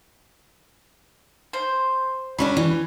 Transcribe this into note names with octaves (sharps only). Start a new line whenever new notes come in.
C5
F#3 C#4 D4 B5 C#6
E3